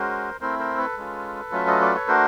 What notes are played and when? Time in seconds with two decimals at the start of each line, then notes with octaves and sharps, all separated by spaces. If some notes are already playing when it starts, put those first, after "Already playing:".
Already playing: G#3 C#4 F#4 A#4 C5
0.41 A3 C4 E4 A#4 C5
0.59 A#4 C5
0.78 A4 B4
0.97 G#3 C#4 F4
1.52 F#3 A3 C#4 F4 E5
1.67 D#5
1.81 D5
1.95 C#5
2.08 A3 D4 F#4 A#4 C5